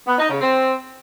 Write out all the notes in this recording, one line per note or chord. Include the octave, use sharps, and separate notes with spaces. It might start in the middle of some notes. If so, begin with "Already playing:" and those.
B3
D#4
C#3
C4